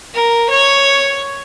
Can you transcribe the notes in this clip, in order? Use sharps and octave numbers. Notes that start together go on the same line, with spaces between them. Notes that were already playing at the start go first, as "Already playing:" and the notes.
A#4
C#5